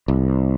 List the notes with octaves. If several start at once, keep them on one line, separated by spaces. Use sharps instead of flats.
C2